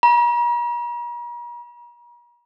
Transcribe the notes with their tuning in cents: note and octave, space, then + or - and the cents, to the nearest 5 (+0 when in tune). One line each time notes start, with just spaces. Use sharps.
A#5 +45